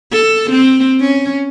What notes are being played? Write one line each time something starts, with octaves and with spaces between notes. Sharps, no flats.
A4
C4
C#4